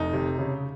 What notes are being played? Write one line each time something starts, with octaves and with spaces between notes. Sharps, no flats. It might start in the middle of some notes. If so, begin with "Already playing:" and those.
Already playing: F1 D#4
C3
C#3